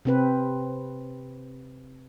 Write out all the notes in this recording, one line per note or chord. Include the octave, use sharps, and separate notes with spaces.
C3 C4 B4